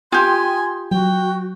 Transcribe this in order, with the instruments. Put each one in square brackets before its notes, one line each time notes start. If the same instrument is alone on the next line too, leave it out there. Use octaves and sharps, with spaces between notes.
[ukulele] F4 G4 [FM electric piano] G5 D#6 [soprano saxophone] G#5 [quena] C6
[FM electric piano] F#3 [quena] F#4 [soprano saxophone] G5